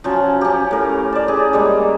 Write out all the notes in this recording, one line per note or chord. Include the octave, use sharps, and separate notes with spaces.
F3 F#3 C#4
C#4 G4
A2 A#4
D5 A5
C#4 G4 G#4
G3 G#3 A#3